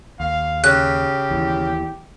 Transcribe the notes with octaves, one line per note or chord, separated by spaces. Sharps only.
D#2 F5
C#3 G4 F#6
D#2 E3